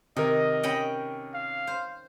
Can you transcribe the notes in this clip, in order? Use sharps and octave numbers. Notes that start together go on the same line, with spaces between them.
C3 D#3 A#4 D#5
C#4 G5 B5
F5
C5